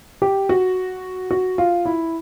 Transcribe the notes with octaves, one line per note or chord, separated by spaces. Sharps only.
G4
F#4
F#4
F4
E4